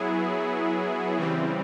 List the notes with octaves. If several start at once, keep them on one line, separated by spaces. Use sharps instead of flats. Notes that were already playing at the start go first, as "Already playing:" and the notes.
Already playing: F#3 B3 E4 G#4
C#3 E3 G3 C4